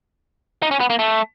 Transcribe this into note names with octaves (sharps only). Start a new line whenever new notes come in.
D#4
C#4
B3
A#3
A3